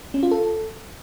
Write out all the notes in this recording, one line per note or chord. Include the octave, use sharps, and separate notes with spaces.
C#4
F4
A4